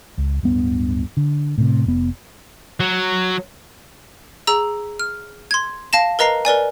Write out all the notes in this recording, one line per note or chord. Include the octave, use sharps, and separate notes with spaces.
C#2
D1 G2 B3
D3
A2 C3
F1 B3
F#3
G#4 A#5 E6
F6
C6 G#6
F5 A5 A#6 E7
A#4 B4 D#5 A#5 A#6 C7
A#4 B4 D5 G#5